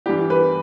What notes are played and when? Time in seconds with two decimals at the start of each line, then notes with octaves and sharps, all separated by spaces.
0.06 G2 E3 G3 B3 G4
0.30 B4